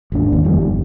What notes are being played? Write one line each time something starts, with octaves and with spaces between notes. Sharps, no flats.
G#1 D#2 D4
D#2
G1 F2 D#3 G3
G1